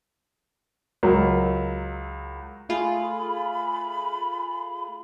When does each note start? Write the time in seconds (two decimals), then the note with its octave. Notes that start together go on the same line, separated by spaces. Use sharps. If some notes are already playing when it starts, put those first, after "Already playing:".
1.03 C#2 F#3 A#4
2.69 A3 F4 G#4 B5